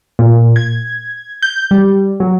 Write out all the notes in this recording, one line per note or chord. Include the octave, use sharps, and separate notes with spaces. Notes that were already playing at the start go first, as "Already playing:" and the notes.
A#2
G#6
G6
G3
F#3